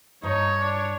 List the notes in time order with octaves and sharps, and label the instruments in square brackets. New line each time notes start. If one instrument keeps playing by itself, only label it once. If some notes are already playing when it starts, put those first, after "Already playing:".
[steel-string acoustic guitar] G2 [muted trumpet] D#4 [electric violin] C#5
[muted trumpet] D4